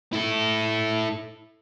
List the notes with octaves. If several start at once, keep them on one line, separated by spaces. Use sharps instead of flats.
E4 A4